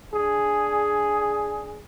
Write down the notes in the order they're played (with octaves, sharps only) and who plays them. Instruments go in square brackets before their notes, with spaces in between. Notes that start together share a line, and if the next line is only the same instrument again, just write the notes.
[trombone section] D4 G#4